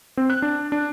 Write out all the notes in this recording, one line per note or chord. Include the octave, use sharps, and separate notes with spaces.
C4
F#6
D4
D4